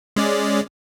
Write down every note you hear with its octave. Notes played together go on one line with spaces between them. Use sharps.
G#3 C#4 D5